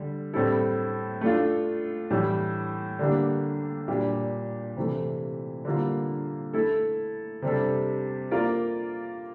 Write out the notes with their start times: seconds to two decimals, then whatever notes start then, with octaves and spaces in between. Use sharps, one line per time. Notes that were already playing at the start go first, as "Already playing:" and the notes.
Already playing: D3 G3
0.33 A2 G3 C4 E4 A4
1.21 A3 D4 F4
2.11 A2 E3 G3
2.99 D3 G3 A#3 D4 G4
3.88 A#2 G3 D4 G4
4.77 C3 E3 A3
5.65 D3 G3 A#3 F4
6.53 A3 E4 A4
7.42 C3 G3 D4 A4
8.31 A#3 F4 A#4 D5